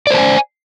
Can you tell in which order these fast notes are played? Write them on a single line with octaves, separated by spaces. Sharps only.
D5 C5 A5 G#5